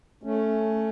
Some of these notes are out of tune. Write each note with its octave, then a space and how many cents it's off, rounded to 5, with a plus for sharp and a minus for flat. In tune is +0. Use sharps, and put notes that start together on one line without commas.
A3 +0 C#4 +0